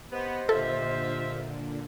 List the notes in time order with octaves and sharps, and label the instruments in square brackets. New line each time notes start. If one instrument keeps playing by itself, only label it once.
[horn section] B3 [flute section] G4 C5 D#5
[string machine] A#2 D3 [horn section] F4 E5 [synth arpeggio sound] A4